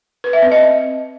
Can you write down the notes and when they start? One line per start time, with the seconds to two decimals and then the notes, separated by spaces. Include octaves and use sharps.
0.24 B4
0.33 E5
0.42 C4
0.52 D#5